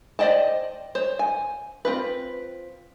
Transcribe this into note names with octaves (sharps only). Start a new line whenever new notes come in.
C5 D5 D#5 G5 A5
C5 C#5
G#5
C4 F4 B4